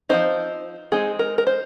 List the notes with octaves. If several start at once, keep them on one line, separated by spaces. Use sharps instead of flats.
F3 G#3 C4 D#4 C5
G#3 C4 D#4 G#4
A#4
A#4
C5